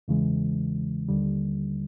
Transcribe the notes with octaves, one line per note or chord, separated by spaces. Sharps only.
E2 C#3 E3 G#3
D#2 D3 G3